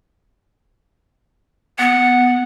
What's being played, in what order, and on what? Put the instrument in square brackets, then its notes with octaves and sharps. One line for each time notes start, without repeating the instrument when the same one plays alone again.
[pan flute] B3 [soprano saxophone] F#5